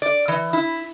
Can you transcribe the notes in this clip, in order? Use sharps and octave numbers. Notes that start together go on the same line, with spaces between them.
D5
E3
E4